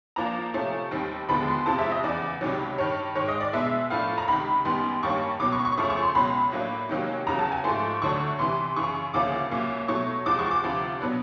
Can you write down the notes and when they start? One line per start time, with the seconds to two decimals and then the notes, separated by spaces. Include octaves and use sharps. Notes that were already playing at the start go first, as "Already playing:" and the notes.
0.16 A#2 F3 A#3 D4 A#5
0.54 C3 F3 A3 C#4
0.91 D#2 D#3 G3 C4
1.29 D#2 D3 F3 G#3 B3 B5
1.48 C6
1.66 F2 C3 F3 G#3 C4 A5
1.79 E5
1.91 D#5
2.04 E2 C#3 E3 D5
2.41 C#2 C3 D#3 F#3
2.78 G2 D#3 G3 C#5
3.15 G#2 D#3 G#3 C#5
3.28 D#5
3.40 D5
3.53 B2 G#3 B3 D4 E5
3.90 A2 F3 A3 D4 F5
4.18 A#5
4.28 C#2 C3 D#3 B5
4.65 F#2 D#3 G3 B3 C6
5.02 G2 D#3 G3 A#3 C#4 C#6
5.39 C#2 B2 F#3 D6
5.52 C#6
5.65 C#6
5.77 F#2 C#3 F3 A3 C#4 C#6
5.90 C#6
6.03 C6
6.15 C#2 B2 F#3 B5
6.52 A2 F#3 A#3 D4
6.89 C3 D#3 F#3 A#3 C#4
7.27 E2 C#3 F#3 A#5
7.39 A5
7.52 G#5
7.64 G#2 F3 A3 C6
8.02 D2 D3 F#3 A3 D4 C#6
8.39 C2 C3 E3 C6
8.76 F#2 C#3 E3 C#6
9.14 D2 C#3 F3 A#3 C#4 D6
9.51 C2 A#2 F#3 A#3 C#4
9.88 B2 F#3 A3 C#6
10.26 E2 C3 F3 G#3 D6
10.39 C#6
10.51 D6
10.64 D2 C3 F3
11.00 B2 F#3 B3 D4